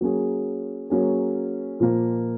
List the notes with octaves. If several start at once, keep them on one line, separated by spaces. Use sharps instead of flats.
F#3 A#3 C#4 G#4
F#3 A#3 C#4 G#4
A#2 F3 A#3